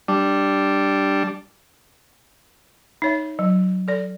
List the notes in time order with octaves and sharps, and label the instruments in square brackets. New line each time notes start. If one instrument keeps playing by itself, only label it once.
[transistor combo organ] G3 D4
[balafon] D#4 C#5 E5
F#3
A4 D5